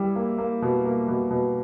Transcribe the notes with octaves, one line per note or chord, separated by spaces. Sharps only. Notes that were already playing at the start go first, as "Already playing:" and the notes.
Already playing: G3 E4
A#3
A#3
B2
A#3
B2
B2